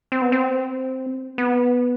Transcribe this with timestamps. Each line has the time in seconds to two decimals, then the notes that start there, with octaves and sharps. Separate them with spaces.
0.12 C4
0.22 B3
0.32 C4
1.38 B3